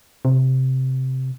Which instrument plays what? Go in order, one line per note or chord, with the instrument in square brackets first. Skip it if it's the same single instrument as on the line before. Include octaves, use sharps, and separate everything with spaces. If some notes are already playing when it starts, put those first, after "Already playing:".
[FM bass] C3